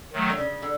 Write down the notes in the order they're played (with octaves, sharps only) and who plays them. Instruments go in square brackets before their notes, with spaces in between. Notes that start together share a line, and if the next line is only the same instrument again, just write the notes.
[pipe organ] D#3 F#3 A3
[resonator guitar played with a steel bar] D3
C#3
D3